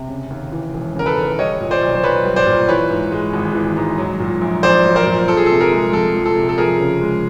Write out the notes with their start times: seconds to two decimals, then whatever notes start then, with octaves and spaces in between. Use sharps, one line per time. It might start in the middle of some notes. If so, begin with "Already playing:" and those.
Already playing: C3
0.09 C#3
0.30 D#2
0.52 E3
0.74 E1
0.95 C#3 A#4
1.06 A4 B4
1.17 D#2
1.39 G3 C#5 D#5
1.61 A#2
1.71 C5 D5
1.82 B1
1.95 C5
2.04 B1 B4 C#5
2.25 G3
2.36 C5 D5
2.47 A#2
2.69 E3 B4 C#5
2.90 G#2
3.12 G#3
3.33 G#1
3.55 E3
3.77 G#2
3.98 F#3
4.20 A#2
4.41 A#1
4.63 A#1 C5 D5
4.85 F#3
4.96 A#4 C5
5.07 A#2
5.28 F3 A4
5.37 G#4
5.46 A4
5.50 C3
5.61 G#4 A#4
5.72 G#3
5.93 F2 A4
6.15 F3
6.26 A4
6.36 C3
6.49 A4
6.58 F3 G#4 A#4
6.80 C#3
7.02 G#3